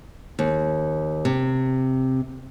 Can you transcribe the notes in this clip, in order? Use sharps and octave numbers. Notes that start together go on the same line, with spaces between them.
D#2
C3